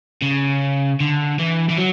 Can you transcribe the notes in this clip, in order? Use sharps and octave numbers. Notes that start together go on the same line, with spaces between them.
C#3
D3
E3
E3
F#3